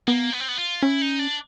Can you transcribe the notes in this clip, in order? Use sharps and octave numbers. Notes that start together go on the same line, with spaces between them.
A#3 B3
B3
C4
B3
F4
C#4 E4
D#4
D4